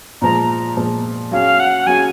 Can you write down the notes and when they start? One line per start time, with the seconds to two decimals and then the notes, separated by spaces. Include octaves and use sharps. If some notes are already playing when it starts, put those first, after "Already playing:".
0.22 A#2 F3 G#3 A#5
0.77 A#2 F3 G#3
1.31 F#3 C#4 G#4 F5
1.60 F#5
1.87 F#3 C#4 G#4 G#5